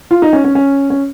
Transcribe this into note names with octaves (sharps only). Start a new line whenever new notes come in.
F4
D#4
C#4
C#4
C#4
C#4